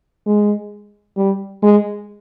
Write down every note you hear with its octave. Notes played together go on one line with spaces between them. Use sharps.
G#3
G3
G#3